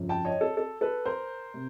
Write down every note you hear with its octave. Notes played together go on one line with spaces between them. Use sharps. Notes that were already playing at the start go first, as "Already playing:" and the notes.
Already playing: G1 F2 C#3 F3
G5 A5
C#5 D#5
A4
A4
A4 B4
A#4 C5
C3